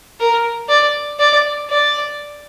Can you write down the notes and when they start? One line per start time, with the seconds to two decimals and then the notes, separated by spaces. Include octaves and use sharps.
0.20 A#4
0.69 D5
1.19 D5
1.70 D5